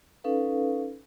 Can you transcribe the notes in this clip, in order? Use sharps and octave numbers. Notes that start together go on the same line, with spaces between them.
C#4 D#4 A4 B4 F5